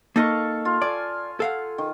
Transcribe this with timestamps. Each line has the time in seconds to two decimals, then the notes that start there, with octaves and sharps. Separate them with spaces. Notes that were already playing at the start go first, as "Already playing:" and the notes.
0.16 A#3 D#4 A4 D#5 F5 C#6
0.65 F4
0.82 D5 G#5
1.40 A4 F5 F#5
1.78 D#3